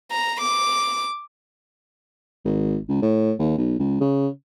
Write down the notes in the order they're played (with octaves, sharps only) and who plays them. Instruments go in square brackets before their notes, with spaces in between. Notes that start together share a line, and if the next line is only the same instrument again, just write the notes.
[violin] A#5
D6
[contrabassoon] G#1
C#2
A2
D#2
B1
C#2
C#3